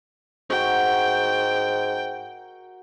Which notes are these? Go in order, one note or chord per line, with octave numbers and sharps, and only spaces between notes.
G#2 F#4 A#4 G5